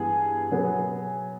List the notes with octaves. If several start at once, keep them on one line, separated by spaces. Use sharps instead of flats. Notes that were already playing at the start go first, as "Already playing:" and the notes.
Already playing: G2 E3 G#3 B3 G#4
B2 F#3 B3